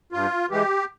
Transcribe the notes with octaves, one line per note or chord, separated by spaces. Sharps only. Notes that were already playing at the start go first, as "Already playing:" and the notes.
G2 F4
E3 G#3 G4